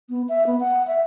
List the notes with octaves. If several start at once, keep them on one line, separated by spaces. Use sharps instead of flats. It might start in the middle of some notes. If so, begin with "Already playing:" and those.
B3
E5
B3
F#5
E5